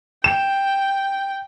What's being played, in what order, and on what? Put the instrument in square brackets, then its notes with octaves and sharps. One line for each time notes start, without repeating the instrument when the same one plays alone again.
[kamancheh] G5 [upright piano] E7